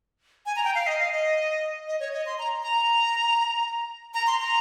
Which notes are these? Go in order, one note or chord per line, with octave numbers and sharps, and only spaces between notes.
G#5
A#5
G5
F5
D#5
F5
D#5
D#5
C#5
D#5
C6
A#5
A#5
A#5
C6
A#5